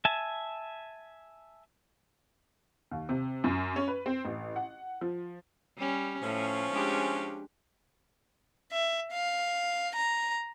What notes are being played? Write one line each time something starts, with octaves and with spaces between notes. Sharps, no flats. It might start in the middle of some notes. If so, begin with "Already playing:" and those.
E5 G#5 A5
D#2
C3
F#2
C#4
B4
C4
A1
F#5
F3
G3 C#4
A2 F3 C#4
G#3 D4 G4
E5
F5
A#5